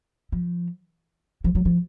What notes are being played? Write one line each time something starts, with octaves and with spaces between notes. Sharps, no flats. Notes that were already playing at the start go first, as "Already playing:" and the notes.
F3
F3
F#3
F3